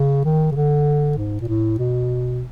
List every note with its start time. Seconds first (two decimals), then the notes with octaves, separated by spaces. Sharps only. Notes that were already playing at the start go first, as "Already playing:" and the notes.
Already playing: C#3
0.25 D#3
0.51 C#3
0.55 D3
1.17 G#2
1.41 A#2
1.48 A2
1.79 B2